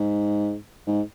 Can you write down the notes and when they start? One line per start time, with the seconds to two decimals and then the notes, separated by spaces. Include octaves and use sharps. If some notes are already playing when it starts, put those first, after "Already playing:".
Already playing: G#2
0.87 G#2